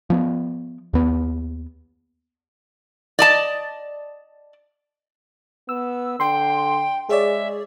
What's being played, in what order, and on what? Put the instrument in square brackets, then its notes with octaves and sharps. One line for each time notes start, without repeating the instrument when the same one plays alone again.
[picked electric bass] F3 B3
D#2 B3
[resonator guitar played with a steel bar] D5 D#5 A5
[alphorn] B3 [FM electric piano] E6
[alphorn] D3 [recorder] G5 [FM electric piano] C6
[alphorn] G#3 [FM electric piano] G#4 C#5 D5 [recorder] E5